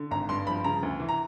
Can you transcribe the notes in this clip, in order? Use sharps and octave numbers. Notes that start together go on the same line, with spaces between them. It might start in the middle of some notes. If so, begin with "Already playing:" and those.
Already playing: D3
G#1 A#5
G2 C6
F3 B5
C#3 A#5
D2
E3
A#5